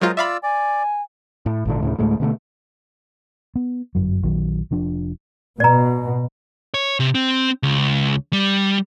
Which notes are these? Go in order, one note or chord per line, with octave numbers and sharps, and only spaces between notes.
F#3 G#3 F4 A#4 C5 D#5
F4 D5 E5 F5 B5 E6
D5 G#5
A2
G#1 A#2 D3
D2 A2 C#3
D2 A2 G#3 A3
B2 D3 F3 A3
B3
G1 F#2 F#3
A#1 D#3 F#3
F1 F3 D4
B2 D5 A#5
C#5
C3
C4
C#2
G3